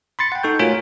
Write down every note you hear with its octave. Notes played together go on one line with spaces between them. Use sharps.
B5 C6 A6 C#7
F#5 G5
D#4 A4 C#6 G6
A3 F4 F#4 A#4 C#5 G#5